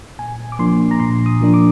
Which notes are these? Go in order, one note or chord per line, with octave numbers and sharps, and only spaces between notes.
A#2 G#5
D6
F3 A#3 D4 C6
A#5
A#2 C6
D#6
F3 A#3 D4
D6